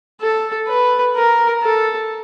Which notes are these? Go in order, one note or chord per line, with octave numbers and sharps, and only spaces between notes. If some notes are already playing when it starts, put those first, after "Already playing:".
A4
B4
A#4
A4